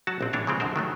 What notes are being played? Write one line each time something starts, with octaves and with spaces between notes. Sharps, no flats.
F#3 F#4 A5
A#1 C4
A2 E3 D4 C#5
C#3 E3 F3 G#3 C4
F#2 D3 C4 A#4 C5
D#3 F#3 A3